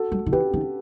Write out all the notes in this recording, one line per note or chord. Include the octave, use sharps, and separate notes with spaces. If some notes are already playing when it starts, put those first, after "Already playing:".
Already playing: F#4 A4
G3
D#3
E3 G4 B4
D#3